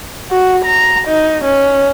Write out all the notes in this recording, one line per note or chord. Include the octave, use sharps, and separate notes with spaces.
F#4
A#5
D#4
C#4